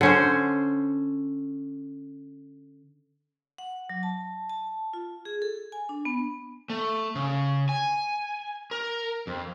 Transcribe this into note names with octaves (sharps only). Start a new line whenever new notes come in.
D3 C#4 C5
F#5
F#3
A5
A5
F4
G#4
A4
G#5
D4
B3
A3
C#3
G#5
A#4
F2